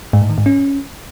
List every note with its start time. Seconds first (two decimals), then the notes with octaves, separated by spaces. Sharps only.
0.13 G#2
0.22 A2
0.30 D#3
0.38 G#2
0.46 C#4